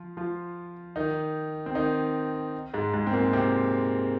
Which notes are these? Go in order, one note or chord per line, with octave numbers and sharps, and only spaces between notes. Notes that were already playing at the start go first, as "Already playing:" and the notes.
Already playing: F3 F4
F3 F4
D#3 D#4
C4
D#3 D#4
G#2 G#3
G#2 G#3
C4
A#2 A#3
C3 C4